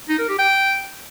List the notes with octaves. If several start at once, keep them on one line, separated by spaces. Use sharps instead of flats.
D#4
A#4
G4
G5